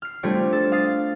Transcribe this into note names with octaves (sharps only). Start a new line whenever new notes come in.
F6 C7
G3 A3 C4 D4 F4 C#5
A4
F5 D#6 A6 C7